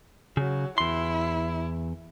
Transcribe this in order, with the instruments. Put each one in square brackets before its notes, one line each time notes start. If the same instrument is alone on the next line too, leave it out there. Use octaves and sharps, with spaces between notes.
[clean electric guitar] C#3 [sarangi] F#3
[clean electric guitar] E2 C6 [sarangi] E4